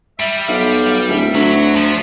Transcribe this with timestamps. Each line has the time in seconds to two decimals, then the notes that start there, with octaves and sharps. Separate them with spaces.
0.20 G3 E5
0.48 B1 F5
1.09 D1 E5
1.35 D2 F#3
1.76 F3